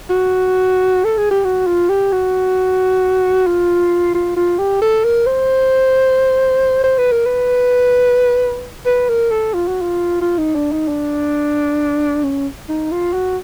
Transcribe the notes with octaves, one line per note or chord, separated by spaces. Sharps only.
F#4
A4
G#4
G4
F#4
F4
G4
F#4
F4
F4
F4
G4
A4
A#4
C5
C5
B4
A#4
B4
B4
A#4
A4
F4
F#4
F4
F4
D#4
D4
D#4
D4
C#4
D#4
F4
F#4